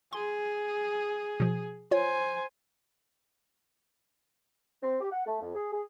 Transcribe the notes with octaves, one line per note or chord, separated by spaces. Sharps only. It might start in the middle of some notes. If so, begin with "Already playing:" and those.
G#4 C6
B2 F3
F4 C5 C#5 G#5
C4
G4
F#5
A3
F2
G#4
G#4